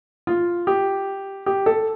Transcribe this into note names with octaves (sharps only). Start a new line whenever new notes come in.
F4
G4
G4
A4